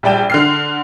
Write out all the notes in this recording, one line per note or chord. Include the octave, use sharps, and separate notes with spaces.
A#1 G3 D5 G5 E7
D3 F6 C7